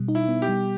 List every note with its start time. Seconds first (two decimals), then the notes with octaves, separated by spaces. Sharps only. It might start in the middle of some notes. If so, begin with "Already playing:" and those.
Already playing: B2 G3
0.08 D#4
0.15 E4
0.28 B3
0.42 G4
0.49 G3